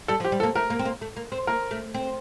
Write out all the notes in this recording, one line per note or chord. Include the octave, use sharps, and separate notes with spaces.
G3 A4
F3
G4
G3
A4
A#3
A3 A#4
A#3
C4
A#3
A3
A#3
C4
A#3 A#4
A3
C4